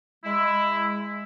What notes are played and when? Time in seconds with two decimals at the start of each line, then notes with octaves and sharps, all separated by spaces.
0.24 G#3 E4